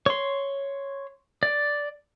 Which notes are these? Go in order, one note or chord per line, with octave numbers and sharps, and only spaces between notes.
C#5 C6
D5